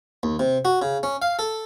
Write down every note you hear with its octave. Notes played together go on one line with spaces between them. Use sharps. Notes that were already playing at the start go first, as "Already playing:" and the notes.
D#2
C3
F#4
C#3
C#4
F5
A4